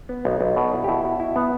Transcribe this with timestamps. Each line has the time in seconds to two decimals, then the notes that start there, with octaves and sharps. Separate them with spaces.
0.09 B3
0.25 B1
0.41 B1
0.56 B2 D5
0.73 E4
0.84 G4
0.88 B2 E4
1.04 B2
1.20 E4
1.36 B3